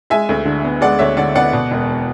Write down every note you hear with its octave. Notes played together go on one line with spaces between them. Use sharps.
G#3 E5 G#5
D2
D3
B3
G#3 D5 F#5
D2 C#5 E5
D3 D5 F#5
B3 D5 F#5
B2
E1